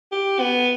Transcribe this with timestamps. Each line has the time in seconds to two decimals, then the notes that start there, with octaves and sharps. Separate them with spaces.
0.12 G4
0.40 B3